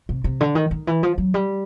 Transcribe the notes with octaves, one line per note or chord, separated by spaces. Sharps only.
C3
C3
D3
D#3
D#3
E3
F3
F#3
G3